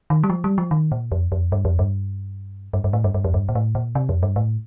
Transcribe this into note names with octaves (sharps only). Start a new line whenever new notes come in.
D#3
G3
F3
G3
F3
D#3
A#2
F2
F2
G2
F2
G2
G2
G2
A2
G2
G2
F2
G2
A#2
A2
A#2
C3
F2
G2
A2